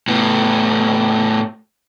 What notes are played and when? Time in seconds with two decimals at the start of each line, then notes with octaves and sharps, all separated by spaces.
0.08 A2 B3